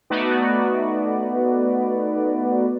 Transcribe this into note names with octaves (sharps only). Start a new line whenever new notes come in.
A3 B3 D#4 F#4 B4 D5